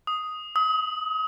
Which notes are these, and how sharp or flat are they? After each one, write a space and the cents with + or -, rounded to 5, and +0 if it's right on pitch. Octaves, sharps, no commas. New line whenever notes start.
D#6 +5
D#6 +35